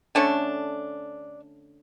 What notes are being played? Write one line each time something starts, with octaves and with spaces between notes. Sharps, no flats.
D3 A3 C#4 D4